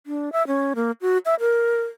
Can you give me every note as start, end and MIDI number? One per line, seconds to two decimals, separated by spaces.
0.07 0.32 62
0.32 0.46 76
0.47 0.73 61
0.75 0.91 58
1.01 1.18 66
1.25 1.35 76
1.40 1.83 70